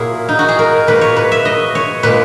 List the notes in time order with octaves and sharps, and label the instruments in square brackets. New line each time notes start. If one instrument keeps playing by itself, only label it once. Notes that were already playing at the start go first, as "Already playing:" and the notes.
Already playing: [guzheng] A#2 F#3 E4 G#4
D#4
F#4
G#4
A#4
A#2 G#3 B4
C#5
B4
E5
D#5
C#5
A#2 G#3 B4